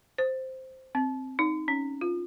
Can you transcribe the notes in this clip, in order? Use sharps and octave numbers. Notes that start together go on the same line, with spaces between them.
C5
C4
D#4
C#4
F4